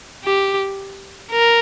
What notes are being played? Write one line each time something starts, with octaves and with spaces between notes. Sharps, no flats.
G4
A#4